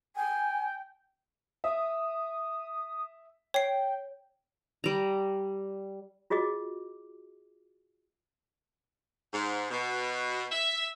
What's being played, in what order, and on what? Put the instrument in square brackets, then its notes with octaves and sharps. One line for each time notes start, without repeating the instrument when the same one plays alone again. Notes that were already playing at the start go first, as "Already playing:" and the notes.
[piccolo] G5 [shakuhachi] G#5
[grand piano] E5 [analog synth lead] D#6
[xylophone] C#5 C7 [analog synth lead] G5
[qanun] G3 A#5
[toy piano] F4 F#4 G#4 D#5 D6
[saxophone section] G#2
B2
E5